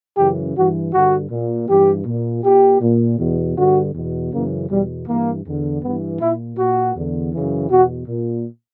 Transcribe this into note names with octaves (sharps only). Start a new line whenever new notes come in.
F#2 C#3 E3 G4
G2 E3 F#4
G2 D3 F#4
A#2
G2 E3 G4
A#2
A#2 G4
A#2
E2 B2
G2 D3 F#4
E2 B2
F#2 C#3 E3 A#3
E2 B2 G3
G2 E3 A#3
E2 D3
G2 E3 B3
A#2 E4
A#2 F#4
E2 D3
F#2 C#3 E3
E2 B2 F#4
A#2